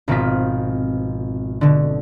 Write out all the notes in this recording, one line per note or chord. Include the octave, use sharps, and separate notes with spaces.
G#1 B2 F3 C4 F4 B6
B2 D3